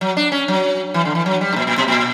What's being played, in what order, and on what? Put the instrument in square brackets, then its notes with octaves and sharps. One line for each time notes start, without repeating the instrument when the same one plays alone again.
[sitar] F#3
D4
C#4
F#3
E3
D3
E3
F#3
G3
G2
A#2
A#2
B2
A#2